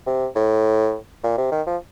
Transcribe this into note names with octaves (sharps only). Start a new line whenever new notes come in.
C3
A2
A#2
C3
D#3
F3